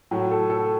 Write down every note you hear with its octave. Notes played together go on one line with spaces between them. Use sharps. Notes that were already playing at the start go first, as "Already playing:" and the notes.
A2 F#3
A4
A4